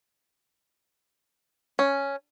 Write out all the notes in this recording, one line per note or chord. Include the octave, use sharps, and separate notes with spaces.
C#4